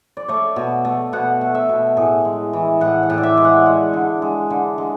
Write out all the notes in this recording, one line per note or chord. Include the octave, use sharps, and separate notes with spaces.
D5
A3 C#5
B2
A3
B2 F#5
A3
E5
B2
A2 G#4
G#3
E3
A2 F#5
F#5
A2
D5
E5
G#3
F#5
G#3
D3
G#3
D3
G#3